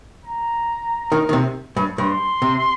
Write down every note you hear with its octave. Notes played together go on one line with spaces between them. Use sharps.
A#5
D#3
D#3
C3
G2
G2 C6
C3